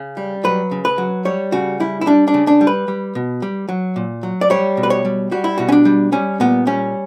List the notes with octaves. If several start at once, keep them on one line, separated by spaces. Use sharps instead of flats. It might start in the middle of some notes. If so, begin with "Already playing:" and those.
Already playing: C#3
G3
F#3 B4
C#3
B4
F#3
G3 C#5
C#3 F#4
G3 E4
E4
G3 D4
D4
C#3
D4
G3
B4
G3
B2
G3
F#3
A#2
F#3
D5
G3 C#5
B2
B4
C#5
G3
G3 F#4
E4
B2 F#4
C#4
D4
G3
G3 C#4
A#2 B3
G3 C#4